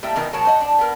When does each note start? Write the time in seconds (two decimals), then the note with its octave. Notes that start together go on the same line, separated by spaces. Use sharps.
0.03 A2 G3 A#3 E5 G5
0.16 B2 D#3 E3 B3 D#4 A#4
0.33 B2 F#3 G#3 A#4 C#5 A5
0.45 C5 C#5 D#5 F#5
0.61 D4
0.78 B3 A#4